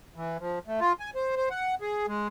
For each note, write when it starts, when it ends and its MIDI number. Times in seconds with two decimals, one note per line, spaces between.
0.16 0.37 52
0.39 0.59 53
0.67 0.80 57
0.81 0.93 65
1.00 1.10 80
1.15 1.35 72
1.36 1.49 72
1.50 1.75 78
1.81 2.06 68
2.08 2.28 56